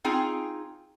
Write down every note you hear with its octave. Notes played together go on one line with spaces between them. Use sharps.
C4 D#4 F4 G#4 G5 G#5